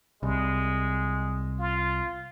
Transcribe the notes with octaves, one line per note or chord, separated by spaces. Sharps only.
C2 G#3
F4